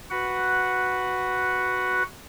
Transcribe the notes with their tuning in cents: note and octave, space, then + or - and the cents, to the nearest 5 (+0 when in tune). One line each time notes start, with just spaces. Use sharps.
F#4 +0 B4 +0 F#5 +0